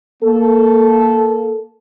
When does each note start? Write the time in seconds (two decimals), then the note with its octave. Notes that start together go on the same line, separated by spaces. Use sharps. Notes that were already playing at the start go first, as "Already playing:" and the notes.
0.23 A#3 A4